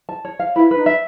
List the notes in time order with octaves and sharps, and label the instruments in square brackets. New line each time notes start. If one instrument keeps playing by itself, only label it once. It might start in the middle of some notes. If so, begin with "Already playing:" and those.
[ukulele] A5
C#5
F5
[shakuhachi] E4 [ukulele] B4
[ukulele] B4
[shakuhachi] D#4
[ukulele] E5